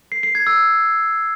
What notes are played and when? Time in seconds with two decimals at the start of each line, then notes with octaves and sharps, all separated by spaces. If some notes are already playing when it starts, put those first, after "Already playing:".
0.12 C7
0.23 C7
0.35 G#6
0.47 E6